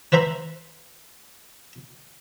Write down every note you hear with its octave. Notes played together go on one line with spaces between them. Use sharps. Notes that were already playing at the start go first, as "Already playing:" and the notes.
B4 C5 E5 A#5 B5